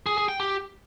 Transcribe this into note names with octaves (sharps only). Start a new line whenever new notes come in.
G#4
G#4
G5
G4